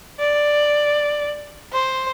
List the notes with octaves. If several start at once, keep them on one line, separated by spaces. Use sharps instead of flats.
D5
C5